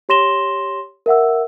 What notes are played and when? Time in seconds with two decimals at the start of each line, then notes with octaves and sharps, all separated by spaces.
0.09 G4 C#5 C6 A#6 E7 G7
1.06 A#4 E5 F#5 E6